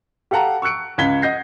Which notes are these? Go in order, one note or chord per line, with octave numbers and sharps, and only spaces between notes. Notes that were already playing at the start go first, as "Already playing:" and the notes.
G4 A4 F5 F#5 A5 A#5
C#6 E6 F#6 C#7 D7
C#2 F5 B5 G#6 B6 G7
D#5 F#5 G6 A#6 C7